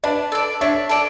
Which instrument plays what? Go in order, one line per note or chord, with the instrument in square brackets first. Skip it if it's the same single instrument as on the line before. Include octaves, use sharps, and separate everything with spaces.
[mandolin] D4 [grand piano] B4 D5
[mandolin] A4 D5
[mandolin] D4 [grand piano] C#5 E5
[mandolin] A4 D5